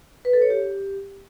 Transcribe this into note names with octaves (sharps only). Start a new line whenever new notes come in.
B4
A4
C#5
G4